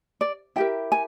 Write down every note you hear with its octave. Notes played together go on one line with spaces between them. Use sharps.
D5
E4 G4 A#4 G5
G#5